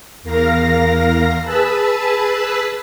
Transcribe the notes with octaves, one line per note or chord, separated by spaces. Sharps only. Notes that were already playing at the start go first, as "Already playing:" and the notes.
E2 A#4 F5 A#6
G#4 B4 A5 B5 E6